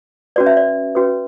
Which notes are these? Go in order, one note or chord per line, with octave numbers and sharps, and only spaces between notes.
C#4 F#4 B4 D5
E5
D5
C#4 F#4 B4